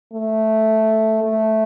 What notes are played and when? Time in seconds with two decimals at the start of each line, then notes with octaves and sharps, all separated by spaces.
0.13 A3
1.24 A3